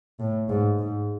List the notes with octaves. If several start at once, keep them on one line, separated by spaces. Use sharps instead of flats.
A2
G#2
G#2